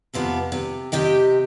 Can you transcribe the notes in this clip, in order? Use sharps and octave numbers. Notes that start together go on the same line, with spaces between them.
F2 C3 F3 B3
C3
C3 G4 D#5 G5